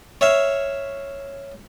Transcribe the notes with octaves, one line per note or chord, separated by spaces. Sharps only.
C#5 E5 F5